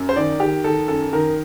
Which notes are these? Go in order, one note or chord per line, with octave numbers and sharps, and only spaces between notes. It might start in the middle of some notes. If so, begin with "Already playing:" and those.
Already playing: F#2
C5
D#3 D5
D#3 G4
D#3 A4
F#2 A4
D#3 A#4